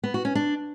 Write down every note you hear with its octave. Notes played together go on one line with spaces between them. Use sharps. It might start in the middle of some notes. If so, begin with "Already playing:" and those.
B3
F#4
C#4
D4